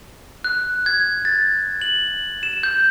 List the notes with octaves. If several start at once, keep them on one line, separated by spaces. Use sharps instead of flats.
F#6
G#6
A6
F#7
E7
G6